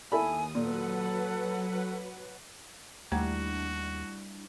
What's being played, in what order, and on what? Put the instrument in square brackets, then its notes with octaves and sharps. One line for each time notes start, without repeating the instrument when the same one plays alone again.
[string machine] D#2 D#6 [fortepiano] E4 A4 B5 [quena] G#5
[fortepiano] A#2 [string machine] F#3 B4 F#5 [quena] A4
[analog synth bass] D#2 [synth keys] G3 D4 E4 [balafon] A3 F#5 A#5 [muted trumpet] F#4